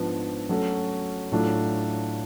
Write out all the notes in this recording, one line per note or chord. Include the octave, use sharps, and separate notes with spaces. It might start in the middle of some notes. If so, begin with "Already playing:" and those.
Already playing: G#2 F3 B3 D4
F#3 A3 C#4 F#4 A4
A2 F#3 A3 D4 F4